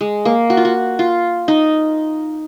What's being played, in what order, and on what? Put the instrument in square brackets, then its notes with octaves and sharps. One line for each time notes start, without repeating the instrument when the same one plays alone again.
[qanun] G#3
A#3
F#4
F4
F#4
F4
D#4